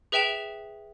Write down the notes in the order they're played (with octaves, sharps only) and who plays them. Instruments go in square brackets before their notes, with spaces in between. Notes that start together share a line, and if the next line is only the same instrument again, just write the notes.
[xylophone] G#4 B4 E5 G5 E7 F7